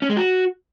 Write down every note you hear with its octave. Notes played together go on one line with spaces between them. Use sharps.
C#4
G#3
F#4